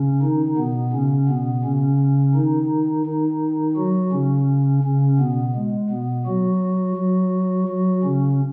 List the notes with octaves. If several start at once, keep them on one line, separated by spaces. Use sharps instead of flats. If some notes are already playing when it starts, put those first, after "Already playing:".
Already playing: C#3 C#4
D#3 D#4
B2 B3
C#3 C#4
B2 B3
C#3 C#4
D#3 D#4
D#3 D#4
F#3 F#4
C#3 C#4
C#3 C#4
B2 B3
G#3
B2 B3
F#3 F#4
F#3 F#4
F#3 F#4
C#3 C#4